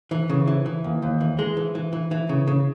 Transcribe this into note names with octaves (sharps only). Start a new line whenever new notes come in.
E3
C#3
E3
E3
D#2
D#2
E3
G#3
E3
E3
E3
E3
C#3
C#3